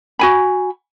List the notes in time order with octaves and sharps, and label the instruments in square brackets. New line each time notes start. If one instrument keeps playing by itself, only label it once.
[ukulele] F#4 G#5 B5